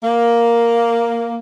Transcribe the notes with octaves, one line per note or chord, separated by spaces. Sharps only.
A#3